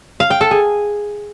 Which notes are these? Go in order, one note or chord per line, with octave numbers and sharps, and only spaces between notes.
F5
G5
A4
G#4